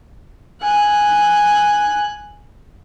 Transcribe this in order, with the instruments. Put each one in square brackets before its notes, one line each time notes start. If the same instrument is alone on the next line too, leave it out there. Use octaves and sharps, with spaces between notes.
[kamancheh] G#5 F#6